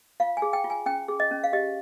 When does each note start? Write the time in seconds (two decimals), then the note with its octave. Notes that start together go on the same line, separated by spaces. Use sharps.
0.20 F4 F5
0.37 G#5
0.42 G#4
0.53 G5
0.64 F4
0.70 G#5
0.86 C#4 G5
1.08 G#4
1.20 D#5
1.31 C#4
1.44 F5
1.53 G4 D#5